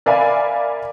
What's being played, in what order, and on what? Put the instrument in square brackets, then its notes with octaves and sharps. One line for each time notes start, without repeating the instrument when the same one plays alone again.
[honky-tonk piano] A#4 D5 E5 F5 G#5 B5